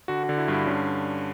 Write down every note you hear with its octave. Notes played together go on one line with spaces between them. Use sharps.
D3 F#4
F#4
D3
E4
G2 E4
D3 C#4